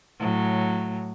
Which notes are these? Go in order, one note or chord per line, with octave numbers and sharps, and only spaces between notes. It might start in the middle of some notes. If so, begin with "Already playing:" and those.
A2 F#3